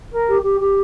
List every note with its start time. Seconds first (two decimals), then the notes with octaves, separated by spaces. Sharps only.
0.10 A#4
0.27 G4
0.42 G4
0.60 G4